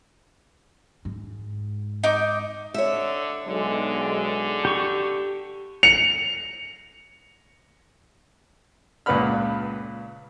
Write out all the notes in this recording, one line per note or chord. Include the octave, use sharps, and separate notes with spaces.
G#2
D#4 D6
D3 C#5 E5
B1 D3 G#3
G4 C#6
C#7 F7
C#2 A#2 B4 F#5 B5 F6